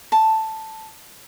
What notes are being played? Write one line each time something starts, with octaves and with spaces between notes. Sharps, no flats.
A5